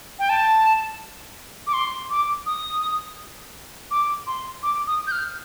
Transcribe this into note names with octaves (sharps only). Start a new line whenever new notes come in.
G5
A5
D6
C6
D6
D#6
D6
C6
D6
D#6
G6
F6